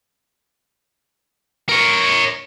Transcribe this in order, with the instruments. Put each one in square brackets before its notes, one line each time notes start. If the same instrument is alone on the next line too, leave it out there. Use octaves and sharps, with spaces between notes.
[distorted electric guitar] A#4 C#5